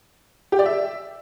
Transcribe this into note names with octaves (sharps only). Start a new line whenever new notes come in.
G4
D5
E5